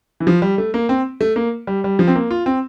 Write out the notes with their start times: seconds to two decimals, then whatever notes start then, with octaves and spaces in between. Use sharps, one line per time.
0.20 E3
0.27 F3
0.42 G3
0.58 A3
0.74 A#3
0.89 C4
1.21 A3
1.36 A#3
1.67 G3
1.84 G3
1.99 F3
2.08 C4
2.16 A#3
2.31 F4
2.46 C4